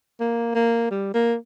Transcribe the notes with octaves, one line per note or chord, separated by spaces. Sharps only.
A#3
A#3
G3
A#3